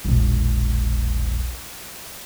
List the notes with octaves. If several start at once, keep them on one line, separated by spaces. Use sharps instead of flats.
E1 A#1